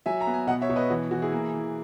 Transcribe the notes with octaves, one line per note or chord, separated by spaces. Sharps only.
F#3 E5 G#5
A#5
B3
G#5
B2 D#5 F#5
C#5 E5
B2
B4 D#5
E3 F#4
E3 F#4
E4 G#4
A#3
E3